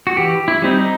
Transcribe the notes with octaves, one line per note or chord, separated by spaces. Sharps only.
F#4
E3 G4
E4
G3 C4 D#4
D#4